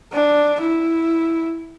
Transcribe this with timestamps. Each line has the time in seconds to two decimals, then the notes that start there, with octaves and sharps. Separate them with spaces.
0.13 D4
0.61 E4